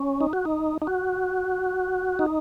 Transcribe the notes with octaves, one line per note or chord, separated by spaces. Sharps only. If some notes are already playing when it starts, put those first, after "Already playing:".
Already playing: C#4
D#4
F#4
D#4
D#4
F#4
D#4